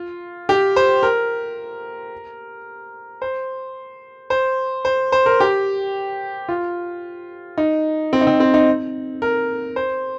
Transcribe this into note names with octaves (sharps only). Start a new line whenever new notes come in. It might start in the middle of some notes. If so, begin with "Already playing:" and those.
Already playing: F4
G4
C5
A#4
C5
C5
C5
C5
A#4
G4
F4
D#4
C4
D#4
C4
C4
D#4
A#4
C5